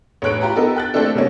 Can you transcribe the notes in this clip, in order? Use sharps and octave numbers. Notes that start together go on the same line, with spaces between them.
A1 A3 C#5 F#6 D7
F4 G4 A#5 B5
B3 D#4 G4 A4 A#4
G5 F#6 A6
A3 A#3 C4 D4 A4
C3 G3 A#3 B3 C#4